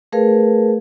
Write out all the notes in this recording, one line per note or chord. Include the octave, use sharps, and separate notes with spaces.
A3 G#4 A#4 B4 F5